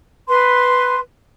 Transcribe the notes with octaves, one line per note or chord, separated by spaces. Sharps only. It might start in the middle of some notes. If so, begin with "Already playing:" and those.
B4 C6